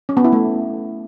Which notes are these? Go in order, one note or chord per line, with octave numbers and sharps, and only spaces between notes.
C#4
B3
E4
A3